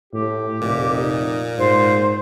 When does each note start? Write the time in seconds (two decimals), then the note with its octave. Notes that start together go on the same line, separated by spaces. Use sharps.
0.13 A2 G4
0.62 F1 A#2
0.93 D#4
1.58 G#2 F4 C5